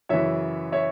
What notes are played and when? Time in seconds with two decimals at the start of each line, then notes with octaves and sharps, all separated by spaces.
0.09 F#2 C#3 E3 C#5 E5
0.72 C#5 E5